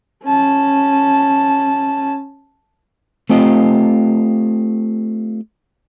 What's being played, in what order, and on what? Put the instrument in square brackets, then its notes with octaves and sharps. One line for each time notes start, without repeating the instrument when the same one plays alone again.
[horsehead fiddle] C#4 A5
[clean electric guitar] A3 C4 F4 G4 D#5